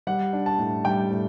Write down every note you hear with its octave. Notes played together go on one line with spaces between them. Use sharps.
G3 F#5
D4
A5
A2
G3 G5
A2